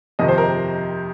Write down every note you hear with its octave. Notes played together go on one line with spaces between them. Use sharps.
F2 C3 D#3 D#5
C5
A#4